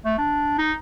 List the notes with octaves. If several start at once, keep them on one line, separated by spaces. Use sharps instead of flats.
A3
D4
D#4